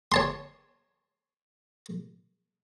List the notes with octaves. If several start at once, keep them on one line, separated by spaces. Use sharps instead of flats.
C#5 A5 C6